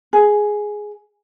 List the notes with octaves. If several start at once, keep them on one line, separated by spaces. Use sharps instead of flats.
G#4